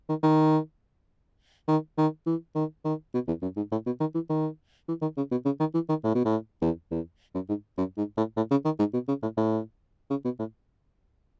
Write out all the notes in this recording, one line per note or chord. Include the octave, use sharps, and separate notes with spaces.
D#3
D#3
D#3
D#3
E3
D#3
D#3
B2
E2
F#2
G#2
A2
B2
D#3
E3
D#3
E3
D#3
C#3
B2
C#3
D#3
E3
D#3
A2
B2
A2
E2
E2
F#2
G#2
F#2
G#2
A2
A2
C#3
D#3
G#2
B2
C#3
A2
A2
C#3
B2
A2